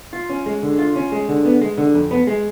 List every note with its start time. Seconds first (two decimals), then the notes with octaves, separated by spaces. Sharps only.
0.13 F4
0.30 C#4
0.46 G#3
0.63 D3
0.79 F4
0.96 C#4
1.12 G#3
1.28 D3
1.45 B3
1.61 G#3
1.78 D3
1.94 F2
2.11 B3
2.27 G#3